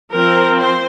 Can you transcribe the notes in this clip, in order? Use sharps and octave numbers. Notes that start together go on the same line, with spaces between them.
F3 C4 A#4
C5